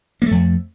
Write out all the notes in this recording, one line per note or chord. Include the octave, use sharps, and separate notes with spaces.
F2 A3 A#3